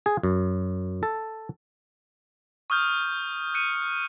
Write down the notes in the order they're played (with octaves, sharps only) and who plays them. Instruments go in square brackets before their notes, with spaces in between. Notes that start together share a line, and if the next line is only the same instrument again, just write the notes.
[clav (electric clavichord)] G#4
F#2
A4
[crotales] C#6 D#6 F6 G6
F#6 C#7 D#7